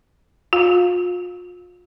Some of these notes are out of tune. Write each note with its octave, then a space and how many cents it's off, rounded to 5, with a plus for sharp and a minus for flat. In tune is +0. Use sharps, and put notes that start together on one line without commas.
F4 +35 F5 +15